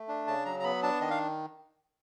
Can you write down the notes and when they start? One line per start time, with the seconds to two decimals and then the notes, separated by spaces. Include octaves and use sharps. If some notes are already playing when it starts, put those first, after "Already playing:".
Already playing: A3
0.08 D4
0.27 C#3 A5
0.45 F#3 A#5
0.60 A#5
0.64 B3 B5
0.83 D4 A5
1.01 D#3 D#5
1.11 F5